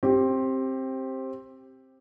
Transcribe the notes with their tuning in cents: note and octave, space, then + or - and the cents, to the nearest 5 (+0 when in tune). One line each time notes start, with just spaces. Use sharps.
C4 +15 G4 +0